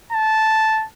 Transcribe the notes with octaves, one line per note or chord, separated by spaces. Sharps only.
A5